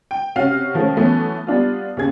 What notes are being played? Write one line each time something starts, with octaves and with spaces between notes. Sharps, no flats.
G5
C3 C#4 F#4 F5 F6
D#3 F3 G#3 A3 C#4
E3 F#3 A3 B3 C#4
G3 B3 D4 F4
D#2 C#3 G#4 G#6